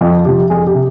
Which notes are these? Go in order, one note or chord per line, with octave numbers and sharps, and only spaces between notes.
F2 F4
C3 F3 G4
F2 G#4
G4
C3